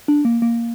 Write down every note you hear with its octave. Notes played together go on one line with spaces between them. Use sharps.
D4
A#3
A#3